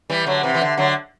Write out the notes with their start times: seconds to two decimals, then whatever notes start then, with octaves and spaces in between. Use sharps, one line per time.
0.10 E3 G3
0.26 D3 F#3
0.43 C3 E3
0.54 E3
0.61 D3
0.77 D3 F#3